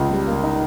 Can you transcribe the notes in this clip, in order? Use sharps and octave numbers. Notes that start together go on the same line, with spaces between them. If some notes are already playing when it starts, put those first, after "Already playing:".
Already playing: C#2
G3
A#3
D#4